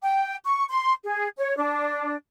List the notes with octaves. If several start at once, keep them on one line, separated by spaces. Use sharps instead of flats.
G5
C#6
C6
G#4
C#5
D4